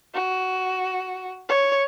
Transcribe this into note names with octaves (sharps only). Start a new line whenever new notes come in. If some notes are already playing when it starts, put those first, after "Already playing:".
F#4
C#5